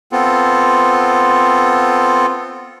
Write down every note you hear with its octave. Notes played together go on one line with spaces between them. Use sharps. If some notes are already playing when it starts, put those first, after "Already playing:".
B3 C4 F4 A4